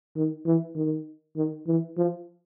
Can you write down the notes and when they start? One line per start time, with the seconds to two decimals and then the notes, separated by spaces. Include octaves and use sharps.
0.16 D#3
0.46 E3
0.76 D#3
1.37 D#3
1.67 E3
1.97 F3